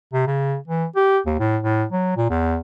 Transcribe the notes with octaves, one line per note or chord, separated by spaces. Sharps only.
C3
C#3
E3
G4
D#2
A2
A2
F#3
A#2
E2